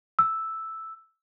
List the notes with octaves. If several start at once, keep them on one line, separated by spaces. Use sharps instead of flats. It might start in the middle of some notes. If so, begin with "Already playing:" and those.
E6